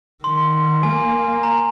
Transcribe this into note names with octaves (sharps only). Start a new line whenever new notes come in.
D#3 C6
A#3 G#5
A#5